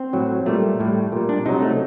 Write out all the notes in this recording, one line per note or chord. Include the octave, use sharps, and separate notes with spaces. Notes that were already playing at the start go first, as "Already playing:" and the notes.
Already playing: C4
A2 F#3
A#2 G3 A3
A2 G3
A#2 G3
D4
C3 F#3 D#4
A3